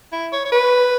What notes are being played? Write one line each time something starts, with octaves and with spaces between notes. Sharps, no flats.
E4
C#5
C#5
B4